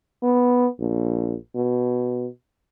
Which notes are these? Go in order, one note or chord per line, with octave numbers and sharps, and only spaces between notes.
B3
A#1
B2